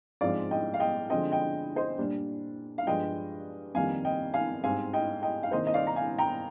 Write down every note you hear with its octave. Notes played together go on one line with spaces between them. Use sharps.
G#2 F3 G#3 C4 D5 F5
D#5 G5
F5
D#5 G5
D3 F3 G#3 C4 D#5 G5
D#5 G5
C5 D#5
A#2 G3 D4
F5
G2 F3 G#3 D4 D#5 G5
F2 D#3 G3 A#3 F5 G#5
D#5 G5
F5 G#5
G#2 G3 C4 F5 G#5
D#5 G5
D#5 G5
F5
C3 D#3 A#3 C5 D#5
D#5
D5 F5
A#5
F5 G#5
G5 A#5